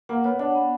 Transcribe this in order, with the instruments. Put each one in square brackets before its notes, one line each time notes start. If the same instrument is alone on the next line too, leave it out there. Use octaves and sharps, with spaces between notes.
[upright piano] A#3 [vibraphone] F#5
[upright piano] B3 [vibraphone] C#5
[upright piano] D4 [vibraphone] F#5
[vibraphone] B3